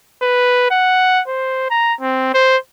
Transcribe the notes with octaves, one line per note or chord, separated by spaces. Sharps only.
B4
F#5
C5
A#5
C4
C5